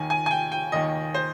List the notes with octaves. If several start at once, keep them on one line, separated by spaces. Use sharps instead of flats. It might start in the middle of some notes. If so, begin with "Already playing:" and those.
Already playing: D#2 D#3 G#5
G#5
G#5
G5
G5
D#2 D#3 D#5
C5